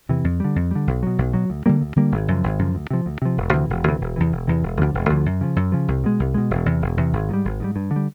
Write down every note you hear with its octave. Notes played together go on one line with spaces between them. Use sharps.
E2 C3 E3
F2
D3 G3
F2
D3 G3
B1
B2 F#3
B1
B2 F#3
D2
D3 G3 A#3
D2
D3 G3 A#3
G#1
F#2 C#3 F3
G#1
F#2 C#3 F3
D2
C3 F3
D2
C3 F3
E1
D2 C3 E3
E1
D2 C3 E3
E1
E2 C3 E3
E1
E2 C3 E3
E1
D2 D3 F3
E1
D2 D3 F3
F#2
C#3 F3
F#2
C#3 F3
C2
B2 G#3
C2
B2 G#3
E1
E2 C3
E1
E2 C3
G#1
G#2 D#3 G3
G#1
G#2 D#3 G3
G2
D3
G3